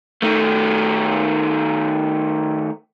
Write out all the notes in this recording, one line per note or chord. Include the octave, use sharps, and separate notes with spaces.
D#3 A3